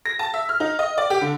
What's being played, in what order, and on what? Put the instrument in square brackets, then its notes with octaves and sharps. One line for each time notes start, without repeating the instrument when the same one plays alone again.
[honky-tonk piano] A#6
A5
E5
F6
D#4
D#5
D5
G4
D3